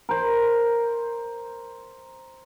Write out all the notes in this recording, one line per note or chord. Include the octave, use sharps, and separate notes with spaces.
A#4 C5